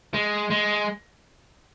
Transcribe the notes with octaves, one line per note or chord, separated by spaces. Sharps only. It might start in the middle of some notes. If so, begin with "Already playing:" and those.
G#3
G#3